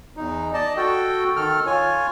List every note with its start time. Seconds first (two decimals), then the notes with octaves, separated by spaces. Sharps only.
0.17 E2 D#4
0.54 D5 D#5 A5
0.77 F#4 A4 G5
1.36 D#3 A4 F6
1.66 F4 C#5 G#5